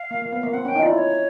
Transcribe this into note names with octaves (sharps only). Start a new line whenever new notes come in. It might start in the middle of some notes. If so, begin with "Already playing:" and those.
Already playing: F5
A#3
A#3
B3
A#3
C4 F#5
C#4 G5
D#4
E4 F4 D5
C#5